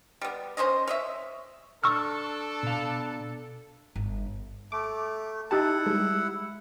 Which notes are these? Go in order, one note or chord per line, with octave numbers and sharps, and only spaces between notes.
G3 B3
C#4 C5 C#5 D#5
C#5 D#5 E5
D4 A4 C#6 E6 F6
B2 F5
G1
A3 D6
D#4 E4 G4 F#5 A5
G3 G#3